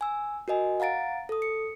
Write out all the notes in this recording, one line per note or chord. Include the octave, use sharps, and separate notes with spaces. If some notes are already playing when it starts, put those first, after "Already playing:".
G#5 E6
F#4 A#4 D#5 G#5
F5 F#5 A#5 A6 D7
A4 D#6
C#7